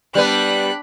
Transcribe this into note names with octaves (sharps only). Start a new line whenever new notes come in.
G3 B3 D4 B4 B5 F#6